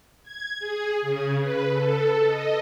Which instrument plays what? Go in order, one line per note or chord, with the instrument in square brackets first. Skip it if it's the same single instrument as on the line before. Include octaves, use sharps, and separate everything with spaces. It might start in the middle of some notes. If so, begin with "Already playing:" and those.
[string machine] G#6
G#4
C#3
B4
A4
D#5